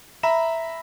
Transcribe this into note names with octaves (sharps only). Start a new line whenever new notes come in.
E5 A#5 B5 E7